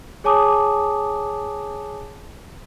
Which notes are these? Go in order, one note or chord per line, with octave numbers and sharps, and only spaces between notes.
G#4 C#5 G#5 A5 D6 D#6